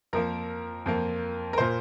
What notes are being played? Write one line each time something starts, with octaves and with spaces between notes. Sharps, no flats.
F2 F3 A#3 A#4
F2 F3 A#3
A#4
A#2 A#3 C5